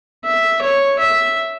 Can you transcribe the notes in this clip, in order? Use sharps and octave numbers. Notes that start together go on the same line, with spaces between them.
E5
C#5
E5